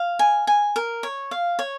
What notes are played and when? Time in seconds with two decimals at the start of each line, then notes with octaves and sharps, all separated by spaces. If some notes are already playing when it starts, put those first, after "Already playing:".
Already playing: F5
0.19 G#5
0.47 G#5
0.76 A#4
1.03 C#5
1.31 F5
1.59 C#5